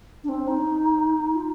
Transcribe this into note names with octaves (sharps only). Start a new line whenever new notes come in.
D4
C4
D#4
F4